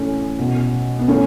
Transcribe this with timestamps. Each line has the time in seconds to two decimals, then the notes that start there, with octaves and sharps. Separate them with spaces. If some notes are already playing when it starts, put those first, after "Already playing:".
Already playing: A2 E3 A3 C#4
0.39 B2
0.99 B3
1.08 E3 A3 C#4